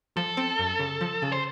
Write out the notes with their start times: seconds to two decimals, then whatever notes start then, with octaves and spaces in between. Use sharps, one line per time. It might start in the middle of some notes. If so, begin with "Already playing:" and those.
0.17 F3 A4
0.37 C4
0.59 F#2
0.80 C#3
1.01 F3
1.22 C#3
1.32 C5